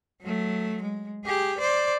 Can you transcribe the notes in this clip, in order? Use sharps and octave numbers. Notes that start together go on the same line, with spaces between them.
F#3 A3
G#3
G4 G#4
C5 D5